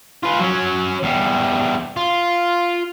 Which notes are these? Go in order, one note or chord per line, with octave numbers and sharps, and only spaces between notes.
F4 B4
F#3 C#4
E2 G3
F4